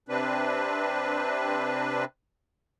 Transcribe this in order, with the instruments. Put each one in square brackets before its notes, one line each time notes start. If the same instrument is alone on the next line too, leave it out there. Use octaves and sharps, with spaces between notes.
[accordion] C3 C4 D4 B4